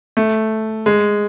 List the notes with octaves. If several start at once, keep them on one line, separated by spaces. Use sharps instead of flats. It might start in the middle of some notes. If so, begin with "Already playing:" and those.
A3
G#3